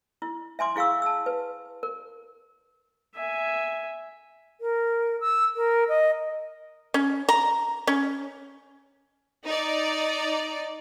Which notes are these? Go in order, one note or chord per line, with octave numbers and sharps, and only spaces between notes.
E4
E5 G#5 C6 D6
E4 G#4 F5 C#6 E6
A5 E6
B4
A#4
E5 G#5
A#4
E6
A#4
D#5
C#4
A#5
C#4
D#4 D5